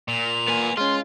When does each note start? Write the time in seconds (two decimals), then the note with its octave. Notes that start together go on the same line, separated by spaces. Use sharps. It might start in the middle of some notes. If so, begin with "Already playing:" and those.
0.08 A#2 F7
0.48 A#3 B3 G#5
0.77 G#3 C#4 F4 C6